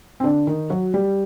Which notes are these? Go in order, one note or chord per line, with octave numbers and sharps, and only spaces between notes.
C4
D3 D4
D#3 D#4
F#3 F#4
G3 G4